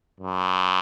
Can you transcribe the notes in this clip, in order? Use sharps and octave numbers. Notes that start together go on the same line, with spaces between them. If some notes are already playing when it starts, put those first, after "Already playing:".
F#2